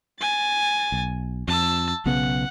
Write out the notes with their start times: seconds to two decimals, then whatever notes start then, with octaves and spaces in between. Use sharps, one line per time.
0.20 G#5 A6
0.92 B1
1.48 F2 A5 E6
2.06 B1 C#3 B3 F#5